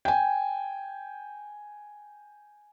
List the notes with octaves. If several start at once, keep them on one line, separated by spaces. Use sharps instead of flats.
G5 G#5